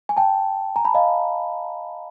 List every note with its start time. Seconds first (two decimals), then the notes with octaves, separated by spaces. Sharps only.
0.09 G#5
0.17 G5 A5
0.76 G#5 A#5
0.85 A5 B5
0.94 D#5 F5